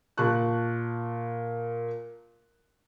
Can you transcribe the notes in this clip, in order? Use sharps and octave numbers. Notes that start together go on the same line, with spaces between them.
A#2 A#4 A5 C#6 F#6